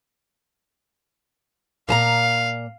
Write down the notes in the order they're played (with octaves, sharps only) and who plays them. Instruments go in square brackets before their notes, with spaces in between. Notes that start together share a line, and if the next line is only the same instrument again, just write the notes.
[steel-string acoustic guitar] A#2 A5 A#5 [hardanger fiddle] F5